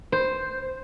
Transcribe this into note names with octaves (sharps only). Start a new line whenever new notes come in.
C5